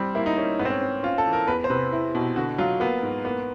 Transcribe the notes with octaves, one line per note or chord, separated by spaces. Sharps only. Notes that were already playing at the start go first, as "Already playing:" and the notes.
Already playing: G3 C4
A#3 E4
D#4
A#3 C#4
G#2 B3
C4
C#4
C4
C#4 F4
A4
E3
A#4
E2 B4
C5
C3 B4
E4
B2
D3 F#4
F#3 F4
A#3 B3
G#2
A#3 B3